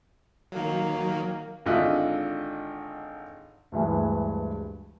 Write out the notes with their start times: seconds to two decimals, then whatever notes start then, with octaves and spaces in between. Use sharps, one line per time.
0.52 D#3 F#3 A#3
1.66 G#1 D3 F4 D#5 E5 F#6
3.72 D2 G2 E3 G#3